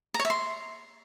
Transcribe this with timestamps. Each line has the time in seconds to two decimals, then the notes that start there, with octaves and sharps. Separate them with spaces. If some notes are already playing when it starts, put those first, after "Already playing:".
0.14 A#5
0.20 C#5
0.25 E5
0.30 C6